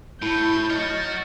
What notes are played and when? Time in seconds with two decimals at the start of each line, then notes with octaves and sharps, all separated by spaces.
0.22 A2 E4 A5 B5 G6
0.70 F#4 C#5 D#5 F6 A6